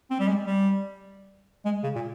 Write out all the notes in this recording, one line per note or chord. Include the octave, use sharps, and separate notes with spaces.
C4
G3
G#3
G3
G#3
C#3
A#2